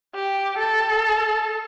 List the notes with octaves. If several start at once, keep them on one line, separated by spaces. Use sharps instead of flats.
G4
A4